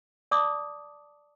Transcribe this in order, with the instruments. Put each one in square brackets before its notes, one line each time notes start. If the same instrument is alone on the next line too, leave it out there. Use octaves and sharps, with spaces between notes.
[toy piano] D5 A5 D6 D#6